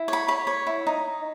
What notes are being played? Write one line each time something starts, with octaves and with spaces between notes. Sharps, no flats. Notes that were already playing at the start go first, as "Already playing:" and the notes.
Already playing: E4
C#5 B5
C#5 B5
C#5
E4
D#4